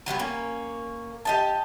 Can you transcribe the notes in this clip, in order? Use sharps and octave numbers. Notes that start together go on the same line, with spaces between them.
F#3 G3 A3 B3
A#3 C#4
G4 D#5 A5